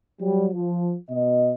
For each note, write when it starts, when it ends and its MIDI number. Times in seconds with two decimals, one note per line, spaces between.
0.21 0.47 54
0.21 0.47 55
0.53 0.96 53
1.10 1.53 47
1.10 1.53 75